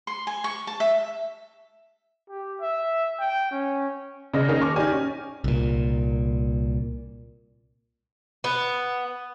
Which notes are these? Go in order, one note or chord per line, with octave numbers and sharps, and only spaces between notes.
C6
G#5
C#6
A5
E5
G4
E5
G5
C#4
C#3 D5 D#5 A#6
D#3 A#3 C#4 D#4 G#4 A#4
C#6 D6 F6
D#4 G4 D5 G#5
C#4
C2 A#2
B3